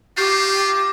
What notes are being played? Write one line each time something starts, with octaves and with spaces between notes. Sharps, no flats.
F4 G4 C#6 D6 G6 A#6 C7 E7